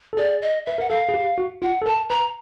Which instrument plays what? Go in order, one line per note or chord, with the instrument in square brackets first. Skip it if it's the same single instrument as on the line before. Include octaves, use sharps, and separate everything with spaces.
[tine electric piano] A4
[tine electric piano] G#4 [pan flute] D5
[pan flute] D#5
[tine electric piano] B4 [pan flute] E5
[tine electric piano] A#4 [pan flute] F#5
[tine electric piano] A4 [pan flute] F5
[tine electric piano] G#4
G4
F#4
[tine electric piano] F4 [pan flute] F#5
[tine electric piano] A4
[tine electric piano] A#4 [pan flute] A5
[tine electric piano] B4 [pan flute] A#5